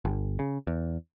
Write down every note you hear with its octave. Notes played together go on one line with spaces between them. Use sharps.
G1
C#3
E2